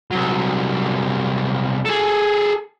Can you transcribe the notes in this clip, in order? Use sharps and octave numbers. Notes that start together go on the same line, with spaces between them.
C2 F#3
G#4 A4